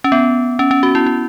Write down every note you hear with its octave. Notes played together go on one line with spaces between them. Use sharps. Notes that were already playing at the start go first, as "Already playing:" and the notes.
C#4
B3
C#4
C#4
F#4
E4
E4